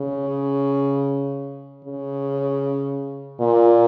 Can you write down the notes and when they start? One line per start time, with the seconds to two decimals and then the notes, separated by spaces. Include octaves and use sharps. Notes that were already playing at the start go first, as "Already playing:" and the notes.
Already playing: C#3
1.85 C#3
3.41 A#2